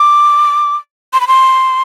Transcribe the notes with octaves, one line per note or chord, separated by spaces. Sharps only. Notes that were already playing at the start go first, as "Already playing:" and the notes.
Already playing: D6
C6
B5
C6